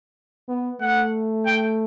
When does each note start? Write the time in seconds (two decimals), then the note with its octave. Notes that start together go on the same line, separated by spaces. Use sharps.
0.48 B3
0.81 A3 F#5
1.46 G5